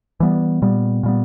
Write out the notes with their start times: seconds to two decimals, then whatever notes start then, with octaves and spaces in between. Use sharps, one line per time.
0.20 E3 G3 B3
0.62 A#2 G3 B3
1.03 A#2 G3 B3